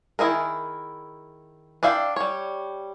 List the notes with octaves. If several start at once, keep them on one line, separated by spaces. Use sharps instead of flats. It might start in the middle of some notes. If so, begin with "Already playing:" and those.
D#3 F#3 E4 G#4 A#4
D4 D5 E5 F5 G5
G3 C#5